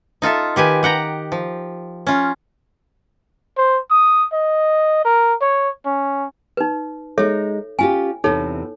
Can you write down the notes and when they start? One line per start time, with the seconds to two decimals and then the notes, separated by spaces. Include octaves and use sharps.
0.22 D#4 F4 A4 E5
0.56 D#3 G4 B4 G#5
0.83 G4 F#5 G5 A#5
1.32 F3
2.07 C#4 F4
3.58 C5
3.91 D#6
4.33 D#5
5.05 A#4
5.41 C#5
5.85 C#4
6.57 D#4 B4
7.18 G#3 D#4 A4 C#5 E5
7.79 C#4 F4 G4 G#5
8.24 E2 C3 D#4 A4 C#5